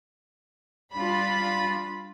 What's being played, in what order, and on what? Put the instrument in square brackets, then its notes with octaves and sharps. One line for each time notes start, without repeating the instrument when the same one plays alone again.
[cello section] G3 D4 F4 [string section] B5